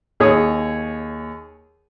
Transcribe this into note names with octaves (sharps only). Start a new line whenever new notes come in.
D#2 G#4 C#5 D#6